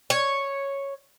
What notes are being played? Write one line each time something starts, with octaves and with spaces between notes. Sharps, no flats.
C#5